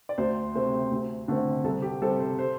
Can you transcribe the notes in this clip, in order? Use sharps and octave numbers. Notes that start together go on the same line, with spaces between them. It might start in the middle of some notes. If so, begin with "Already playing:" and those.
D5
D2 C5
C3 A3 C4
D2
D3 A3 C4
C2 A4
G4
C3 G3 C4 A4
C5
C5